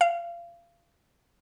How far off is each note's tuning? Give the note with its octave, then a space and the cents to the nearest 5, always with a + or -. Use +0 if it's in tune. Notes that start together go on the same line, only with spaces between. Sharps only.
F5 -30